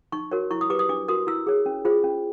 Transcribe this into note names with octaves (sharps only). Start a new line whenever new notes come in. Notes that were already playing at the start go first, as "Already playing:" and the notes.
D#4 C#6
F#4 A#4 C#5
E4 C#6
D#6
G4 B4 D6
D#6
D4 D6
F#4 A#4 D#6
E4 E6
G#4 C#5
C#4
F4 G#4 C5
C#4